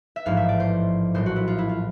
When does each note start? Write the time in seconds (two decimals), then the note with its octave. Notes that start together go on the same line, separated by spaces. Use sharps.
0.16 E5
0.26 A1 G#2 F3 F5
0.37 E5
0.49 D5
0.60 C5
1.14 A#1 A2 F#3 C5
1.26 F#4
1.36 E4
1.48 F4
1.58 E4
1.69 F4